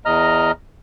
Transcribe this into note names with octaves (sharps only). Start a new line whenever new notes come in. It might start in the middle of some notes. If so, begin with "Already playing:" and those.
E2 D#5 A#5 F6